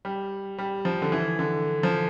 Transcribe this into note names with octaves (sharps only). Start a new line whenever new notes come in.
G3
G3
F3
D3
E3
D3
F3